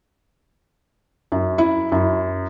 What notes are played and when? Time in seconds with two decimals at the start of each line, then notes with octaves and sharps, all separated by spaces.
1.32 F#2
1.58 E4
1.92 F#2